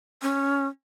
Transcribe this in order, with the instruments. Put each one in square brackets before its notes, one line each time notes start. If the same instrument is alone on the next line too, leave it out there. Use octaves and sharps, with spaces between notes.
[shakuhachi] C#4